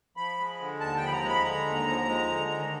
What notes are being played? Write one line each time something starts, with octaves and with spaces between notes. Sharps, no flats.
F3 B5
G#3
D3
D#2 A5
G5
F3 B5
A#5
G#3
B5
D3 A#5
D#2
F3
G#3
D3
D#2